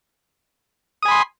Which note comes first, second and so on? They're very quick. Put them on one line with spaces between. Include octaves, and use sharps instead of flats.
D#6 G#5 B5 C6